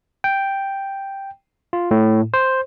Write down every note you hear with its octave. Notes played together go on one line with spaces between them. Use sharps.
G5
F4
A2
C5